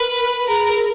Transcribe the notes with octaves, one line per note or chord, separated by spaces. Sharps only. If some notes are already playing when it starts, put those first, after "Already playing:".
Already playing: A#4 B4
G#4 A#4